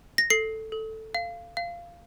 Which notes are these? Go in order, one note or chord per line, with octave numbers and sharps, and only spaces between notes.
A#6
A4 C7
A4
F5
F5